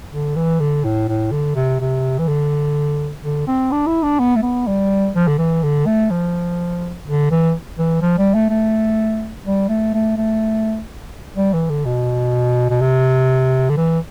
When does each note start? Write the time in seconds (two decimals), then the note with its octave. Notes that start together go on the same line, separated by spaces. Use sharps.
0.12 D3
0.36 E3
0.60 D3
0.84 A2
1.08 A2
1.31 D3
1.55 C3
1.80 C3
2.19 E3
2.27 D3
3.23 D3
3.47 C4
3.72 D4
3.87 E4
4.03 D4
4.19 B3
4.36 A3
4.42 B3
4.67 G3
5.15 F3
5.27 D3
5.38 E3
5.63 D3
5.86 A3
6.11 F3
7.06 D3
7.31 E3
7.78 E3
8.02 F3
8.18 G3
8.34 A3
8.50 A3
9.46 G3
9.69 A3
9.94 A3
10.17 A3
11.37 G3
11.53 E3
11.70 D3
11.85 B2
12.70 B2
12.81 C3
13.69 D3
13.77 E3